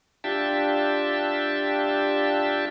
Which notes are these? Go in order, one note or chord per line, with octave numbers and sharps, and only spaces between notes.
D4 F4 G4 E5 G5 A5